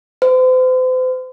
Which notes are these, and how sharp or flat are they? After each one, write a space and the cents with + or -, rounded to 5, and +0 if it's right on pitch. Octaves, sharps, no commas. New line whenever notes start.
C5 -40